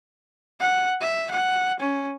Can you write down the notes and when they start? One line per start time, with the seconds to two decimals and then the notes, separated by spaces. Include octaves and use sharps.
0.60 F#5
1.01 E5
1.31 F#5
1.80 C#4